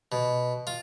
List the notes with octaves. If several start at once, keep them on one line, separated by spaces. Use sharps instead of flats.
B2
F4